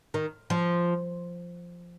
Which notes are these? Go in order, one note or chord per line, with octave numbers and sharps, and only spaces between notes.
D#3
F3